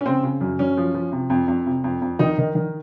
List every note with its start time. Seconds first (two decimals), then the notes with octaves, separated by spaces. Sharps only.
0.01 C#4
0.06 C#3 C4
0.23 C#3
0.41 F#2
0.59 F#2 C#4
0.77 F3
0.94 F3
1.12 C3
1.30 F2
1.48 F2
1.66 C3
1.84 F2
2.02 F2
2.19 D#3 D#4
2.38 D#3
2.55 D#3